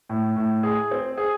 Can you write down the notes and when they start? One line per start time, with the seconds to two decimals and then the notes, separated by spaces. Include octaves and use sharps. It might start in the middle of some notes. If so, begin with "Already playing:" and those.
0.09 A2
0.36 A2
0.63 G#4
0.91 C4
1.18 G#4